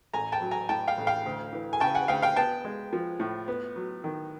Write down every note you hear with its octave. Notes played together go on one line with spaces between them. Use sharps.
A1 G#5 A#5
G5 A5
F#3
G#5 A#5
A2 G5 A5
F5 G5
A1
F5 G5
D2
E3
G#5
C#3 G5 A5
F#5 G#5
D2 F5 G5
F5 G5
B3 G5 A5
G#3
F3
A2
B3
F#3
D#3